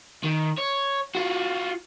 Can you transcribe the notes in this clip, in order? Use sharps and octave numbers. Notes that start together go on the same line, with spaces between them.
D#3
C#5
F4 F#4